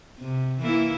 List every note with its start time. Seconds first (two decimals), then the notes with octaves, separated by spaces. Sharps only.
0.19 C3
0.60 E3 A#3 E4